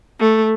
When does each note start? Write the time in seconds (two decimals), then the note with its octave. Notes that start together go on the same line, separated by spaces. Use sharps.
0.20 A3